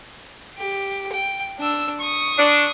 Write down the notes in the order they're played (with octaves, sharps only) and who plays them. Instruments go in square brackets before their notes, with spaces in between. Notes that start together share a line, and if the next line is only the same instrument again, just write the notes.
[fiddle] G4
G5
D4 E6
C#6 D#6
[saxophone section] D4